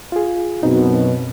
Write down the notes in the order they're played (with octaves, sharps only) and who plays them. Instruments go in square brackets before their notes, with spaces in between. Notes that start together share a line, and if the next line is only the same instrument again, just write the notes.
[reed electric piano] F4 G#4
[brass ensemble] F#2 B2 [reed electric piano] C4 D#4